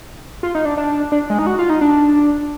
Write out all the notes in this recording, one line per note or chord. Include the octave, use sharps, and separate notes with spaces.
F4
D#4
D4
D4
D4
G#3
D#4
F#4
F4
D#4
D4